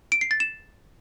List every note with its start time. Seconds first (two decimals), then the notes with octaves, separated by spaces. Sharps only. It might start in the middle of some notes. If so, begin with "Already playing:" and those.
0.12 D7
0.21 C7
0.31 A6
0.40 E7